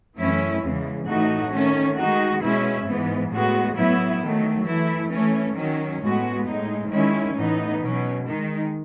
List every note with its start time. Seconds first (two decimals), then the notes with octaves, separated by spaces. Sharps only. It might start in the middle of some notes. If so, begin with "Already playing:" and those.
0.16 F#2 E3 A3 C#4 E4
0.62 E2 C#3 E3 G#3
1.06 A2 E3 A3 D#4 F#4
1.51 D#3 A3 C#4
1.96 D#3 G#3 D#4 F#4
2.41 B2 G#3 C#4 E4
2.86 G#2 E3 B3
3.32 A2 G#3 B3 F#4
3.76 A2 F#3 B3 E4
4.21 D#3 F#3 A3
4.66 E3 A3 E4
5.12 E3 A3 C#4
5.57 D#3 F#3 C#4
6.02 A2 G#3 B3 F#4
6.46 A2 G#3 D#4
6.91 D#3 G#3 C#4 E4
7.36 A2 E3 B3 D#4
7.82 B2 F#3 C#4
8.26 D#3 G#3 D#4